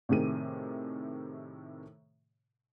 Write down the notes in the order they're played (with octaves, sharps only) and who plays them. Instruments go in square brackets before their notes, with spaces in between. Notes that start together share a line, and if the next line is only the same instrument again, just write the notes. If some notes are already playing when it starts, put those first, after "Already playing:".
[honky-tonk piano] A2 C3 D#3 G#4 D#7